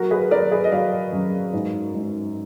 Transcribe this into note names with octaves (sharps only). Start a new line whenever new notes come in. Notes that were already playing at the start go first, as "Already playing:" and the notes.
Already playing: F#3 F#4 A#4
G#4 B4
F#3 A#4 D5
G#4 B4
D#5
F#3 D5 F5
F#2
G#2
G#2